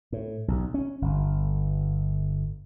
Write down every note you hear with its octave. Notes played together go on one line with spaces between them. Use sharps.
A2
B1
C#4
G1